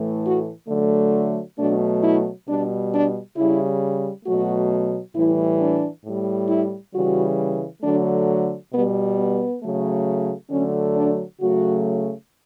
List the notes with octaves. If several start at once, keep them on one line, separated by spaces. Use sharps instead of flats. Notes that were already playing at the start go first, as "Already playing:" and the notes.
Already playing: A2 E3 A3
F#4
D3 F#3 A3
B2 F#3 A3 D4
E4
B2 G3 D4
D4
C#3 G3 E4
B2 F#3 A3 F#4
A2 E3 G3 E4
D4
A2 G3
E4
C#3 E3 G3 F#4
D3 F#3 A3 D4
B2 G3 B3
B3
C#3 F#3 A3
D3 F#3 A3 C#4
D4
C#3 F#3 A3 F#4